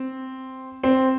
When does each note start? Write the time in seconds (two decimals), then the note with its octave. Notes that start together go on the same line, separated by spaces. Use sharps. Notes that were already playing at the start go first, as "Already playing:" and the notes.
Already playing: C4
0.83 C4